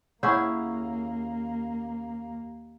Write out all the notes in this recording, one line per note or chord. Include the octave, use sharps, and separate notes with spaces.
D#2 A#3 C#4 E4 G#4 C#5 F#5 C#6